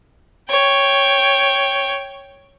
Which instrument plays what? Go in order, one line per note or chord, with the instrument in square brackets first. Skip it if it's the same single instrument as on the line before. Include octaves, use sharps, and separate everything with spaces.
[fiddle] C#5 G5